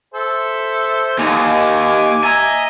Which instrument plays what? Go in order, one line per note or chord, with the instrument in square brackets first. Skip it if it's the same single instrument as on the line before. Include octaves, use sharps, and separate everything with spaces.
[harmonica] A4 C5 E5
[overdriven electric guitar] D#2 [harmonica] G#5 D6
[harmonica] D#5 E5 A#5 [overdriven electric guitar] G#5